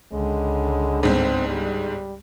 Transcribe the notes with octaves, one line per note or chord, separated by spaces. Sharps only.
C#2 D3 G#3
G1 G#2 C4
G3